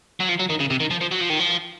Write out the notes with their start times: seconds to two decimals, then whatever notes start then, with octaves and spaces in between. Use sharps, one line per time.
0.20 F#3
0.29 F3
0.39 F#3
0.50 D#3
0.60 C#3
0.70 C3
0.80 D#3
0.91 F3
1.01 F3
1.12 F#3
1.21 F3
1.30 D#3
1.39 F3